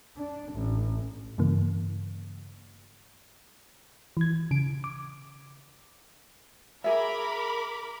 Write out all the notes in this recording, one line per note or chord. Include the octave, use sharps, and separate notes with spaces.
D4
A1
G2 C#3 E3 A#3
E3 G#6
C#3 D7
D6
G#4 A#4 E5 B5 D6